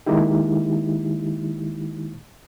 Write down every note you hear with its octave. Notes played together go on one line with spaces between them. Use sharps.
D#3 G#3 A#3 D#4 E4 G4